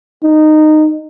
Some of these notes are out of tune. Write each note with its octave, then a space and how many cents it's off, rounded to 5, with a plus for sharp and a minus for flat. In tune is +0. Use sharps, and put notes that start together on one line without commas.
D#4 -15